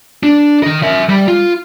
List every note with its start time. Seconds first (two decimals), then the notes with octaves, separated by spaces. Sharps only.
0.23 D4
0.63 D#3 D#5
0.83 A#4 E5
1.09 G3
1.28 F4